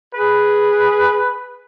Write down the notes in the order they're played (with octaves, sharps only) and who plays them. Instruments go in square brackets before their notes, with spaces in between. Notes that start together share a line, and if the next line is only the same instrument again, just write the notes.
[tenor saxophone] G#4 [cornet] B4